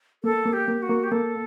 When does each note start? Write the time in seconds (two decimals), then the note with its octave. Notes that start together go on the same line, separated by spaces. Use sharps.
0.24 A#3 A4
0.46 A#3
0.53 G4
0.68 A#3
0.82 F#4
0.90 A#3
1.04 G4
1.12 A#3 A4